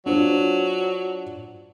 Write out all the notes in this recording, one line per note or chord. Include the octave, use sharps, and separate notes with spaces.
F#3 D4 F4 C5